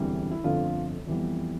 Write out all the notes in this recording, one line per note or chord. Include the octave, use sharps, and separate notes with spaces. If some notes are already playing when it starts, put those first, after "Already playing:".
Already playing: E1 D2 C3 E3 G3
E4
G1 F2 D3 A3 F4
F2 E3 G3 B3